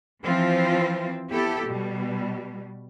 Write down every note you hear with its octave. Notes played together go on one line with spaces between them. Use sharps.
E3 F3 C4 F4
B3 E4 G4 A4
B2 G3